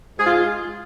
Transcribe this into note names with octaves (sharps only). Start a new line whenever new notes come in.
G#2 G#4
F4